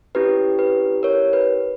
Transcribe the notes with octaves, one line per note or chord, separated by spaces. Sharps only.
C#4 E4 G4 B4
B4
A#4 C#5
B4